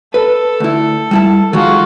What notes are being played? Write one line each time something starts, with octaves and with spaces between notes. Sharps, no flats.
A4 B4
D2 E4
G3 E4 A5
D#3 F#3 G#3 F4 F#4